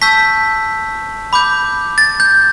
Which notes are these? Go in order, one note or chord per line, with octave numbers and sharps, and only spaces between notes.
A5 C#6 E6 G6 B6
B5 D6 G6
A6
G6